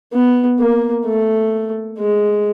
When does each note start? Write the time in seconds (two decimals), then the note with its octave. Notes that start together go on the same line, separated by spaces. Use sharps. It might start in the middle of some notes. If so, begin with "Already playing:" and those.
0.13 B3
0.60 A#3
1.06 A3
1.99 G#3